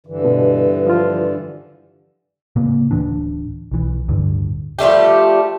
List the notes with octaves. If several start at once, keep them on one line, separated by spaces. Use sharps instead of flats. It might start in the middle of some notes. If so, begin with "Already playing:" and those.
G2 D3 E3
B2
F3 F4
A2 C#3 A#3 B3
D1 E3 D4
B1 E3
D1 G2 D3
F3 G3 A3 G4